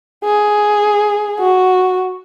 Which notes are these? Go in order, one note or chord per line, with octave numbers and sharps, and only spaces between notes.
G#4
F#4